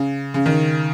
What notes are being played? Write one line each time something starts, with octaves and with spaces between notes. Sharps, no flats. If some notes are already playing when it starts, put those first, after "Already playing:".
Already playing: C#3
C#3
D#3